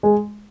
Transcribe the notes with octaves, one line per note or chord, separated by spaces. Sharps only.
G#3